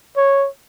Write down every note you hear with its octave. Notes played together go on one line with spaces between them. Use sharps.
C#5